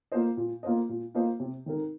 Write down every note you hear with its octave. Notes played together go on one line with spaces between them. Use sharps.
A#3 F4 C5 D#5
A#2
A#3 F4 C5 D#5
A#2
A#3 F4 C5 D#5
C3
D#3 C4 D#4 A#4